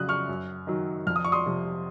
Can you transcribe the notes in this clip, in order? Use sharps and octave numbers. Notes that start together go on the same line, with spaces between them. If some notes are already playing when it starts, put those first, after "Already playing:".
Already playing: F2 C#3 F#3 D#6 F#6
C#6 F6
F#2
D#3 F#3
F2 F6
D#6
C#6
C6 D#6
C3 F3